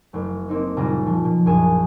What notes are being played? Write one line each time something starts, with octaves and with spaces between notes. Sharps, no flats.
F#1 A3
A#3 C4 D#4
F#1 A#2 C#3 G3 F4 A#5
F3
B2
A#1 F#2 G#5 D#6 E7